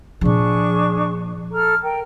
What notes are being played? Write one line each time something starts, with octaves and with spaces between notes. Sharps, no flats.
A#2 F3 D4 G#4 C#6
A4 A#5 F6
A#4 G5